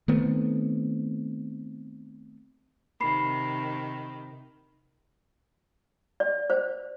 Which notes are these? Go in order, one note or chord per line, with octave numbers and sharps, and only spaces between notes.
D#3 A3 B3 C4
C3 D#3 B5 C7
D5
C5